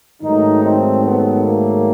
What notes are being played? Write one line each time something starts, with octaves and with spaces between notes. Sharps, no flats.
G#2 D#3 F#3 A3 D#4
C4
B3
A#3